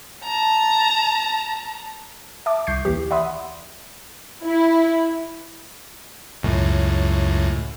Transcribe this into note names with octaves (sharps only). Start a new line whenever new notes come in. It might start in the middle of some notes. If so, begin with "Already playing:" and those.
A5 A#5
E5 A5 D6
C2 C#6 G6 C7
D#2 E3 G4
D5 E5 F#5 B5 C6 D#6
E4
C#2 F#2 A2